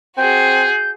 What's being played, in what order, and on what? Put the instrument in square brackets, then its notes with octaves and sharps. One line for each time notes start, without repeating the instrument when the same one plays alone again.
[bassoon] C4 [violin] F#4 G#4 [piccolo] G6